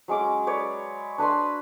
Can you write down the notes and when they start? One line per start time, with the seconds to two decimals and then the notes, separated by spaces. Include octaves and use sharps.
0.08 F#3 G#3 C#4 D6
0.47 B4 C#5 D5
1.18 D4 B4 B5 C6